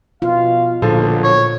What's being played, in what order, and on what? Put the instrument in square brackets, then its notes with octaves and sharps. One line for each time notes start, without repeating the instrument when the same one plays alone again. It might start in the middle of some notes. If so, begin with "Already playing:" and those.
[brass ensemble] B2 F5 [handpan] F4
[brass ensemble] B1 [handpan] A#2 [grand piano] D3 F3
[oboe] C#5